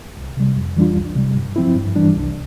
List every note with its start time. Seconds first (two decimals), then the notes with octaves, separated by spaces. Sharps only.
0.17 C2
0.37 C3 G3
0.57 F2
0.77 E3 G3 D4 F4
0.96 C2
1.16 C3 G3
1.36 G2
1.56 F3 C4 E4
1.76 G2
1.96 E3 G3 D4
2.16 C2